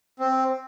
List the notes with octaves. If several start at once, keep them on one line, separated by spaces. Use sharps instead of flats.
C4